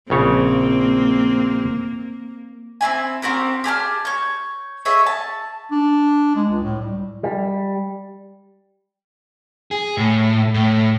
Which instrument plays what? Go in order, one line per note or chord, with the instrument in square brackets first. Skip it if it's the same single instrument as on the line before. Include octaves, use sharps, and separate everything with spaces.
[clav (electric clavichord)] A#1 C#3 C#5 [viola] A#3 [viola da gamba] C4
[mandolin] C4 C#4 E4 G#5
C4 F#4 G4 A#4
G4 G#4 A5 F6
C#5 G6
G#4 C#5 D#5 E5
A5
[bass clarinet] D4
G#3
C#2
A2
G3
[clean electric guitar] G3
[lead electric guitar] G#4
A2
A2